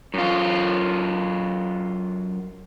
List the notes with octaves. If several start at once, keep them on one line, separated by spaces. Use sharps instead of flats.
F#2 F4